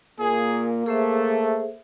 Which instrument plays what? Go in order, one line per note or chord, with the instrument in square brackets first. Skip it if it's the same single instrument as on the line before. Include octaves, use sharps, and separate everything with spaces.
[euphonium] A#2 [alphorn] A#3 [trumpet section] G#4
[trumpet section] A3 [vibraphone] G#4 C5 E5 [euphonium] A4